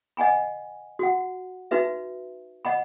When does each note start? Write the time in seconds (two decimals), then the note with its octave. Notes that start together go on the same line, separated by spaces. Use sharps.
0.17 D#5 F#5 G#5 B5
0.99 F#4 F#5
1.71 D#4 F#4 B4 E5
2.65 D#5 F#5 B5